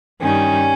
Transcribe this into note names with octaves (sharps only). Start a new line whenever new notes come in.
G2 D#3 G3 C#4